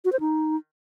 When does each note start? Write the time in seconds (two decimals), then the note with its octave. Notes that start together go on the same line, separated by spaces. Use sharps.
0.05 F#4
0.13 C5
0.20 D#4